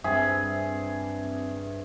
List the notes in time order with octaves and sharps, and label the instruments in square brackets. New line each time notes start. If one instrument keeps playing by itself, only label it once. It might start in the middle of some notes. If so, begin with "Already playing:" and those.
[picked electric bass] G2 [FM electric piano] C4 E5 [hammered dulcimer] G#4